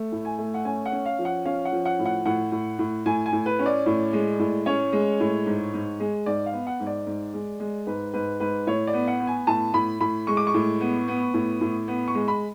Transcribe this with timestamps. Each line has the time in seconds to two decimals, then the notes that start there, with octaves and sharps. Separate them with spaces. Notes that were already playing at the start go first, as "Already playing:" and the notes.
Already playing: A3
0.12 A2
0.25 G#5
0.38 A3
0.54 F#5
0.65 C#4 G#5
0.85 F#5
0.92 C#4
1.06 F5
1.19 F3
1.25 F#5
1.45 C#4 F5
1.65 F#5
1.72 F3
1.85 F#5
1.99 A2
2.05 F#5
2.25 A2 F#5
2.52 A2
2.79 A2
3.06 A2 G#5
3.26 G#5
3.33 A2
3.46 B4
3.59 C#4
3.66 D5
3.86 A2
4.13 G#3
4.39 A2
4.66 C#4 C#5
4.93 G#3
5.20 A2
5.46 G#2
5.73 G#2
6.00 G#3
6.26 G#2 D5
6.46 F5
6.53 B3
6.67 F#5
6.80 G#2
6.87 D5
7.06 G#2
7.33 G#3
7.60 G#3
7.87 G#2 B4
8.13 G#2 B4
8.40 G#2 B4
8.67 A2 C#5
8.87 D5
8.93 B3
9.08 F#5
9.20 B3
9.27 G#5
9.47 A2 A5
9.74 A2 B5
10.00 A2 B5
10.27 G#3 C#6
10.37 D6
10.47 C#6
10.54 A2
10.81 B3
11.08 B3
11.34 A2
11.61 A2
11.88 B3
12.08 C#6
12.15 G#3
12.28 B5